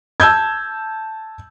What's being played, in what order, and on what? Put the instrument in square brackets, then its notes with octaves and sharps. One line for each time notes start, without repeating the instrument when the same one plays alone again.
[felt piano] A5 E6 G6 G#6